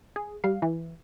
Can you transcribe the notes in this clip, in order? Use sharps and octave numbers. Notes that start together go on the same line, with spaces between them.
G#4
G3 F5
E3